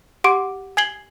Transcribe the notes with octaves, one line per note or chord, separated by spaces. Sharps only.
G4 F#5 C6 D6 D7
G#5 G#6 C7 F#7 G7